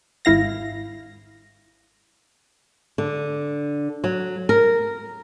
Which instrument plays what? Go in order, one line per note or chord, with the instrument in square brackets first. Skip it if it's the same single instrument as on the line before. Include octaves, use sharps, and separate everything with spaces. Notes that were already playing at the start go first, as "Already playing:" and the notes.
[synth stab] G#1 E4 F5 A#6
[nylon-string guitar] D3
F#3
A#4